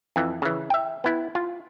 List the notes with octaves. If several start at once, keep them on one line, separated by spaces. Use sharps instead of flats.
F2 E3
C#3 E3
E5 G5
B3 E4
F4